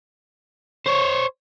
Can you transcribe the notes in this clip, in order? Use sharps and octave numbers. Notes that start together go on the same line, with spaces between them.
C5 C#5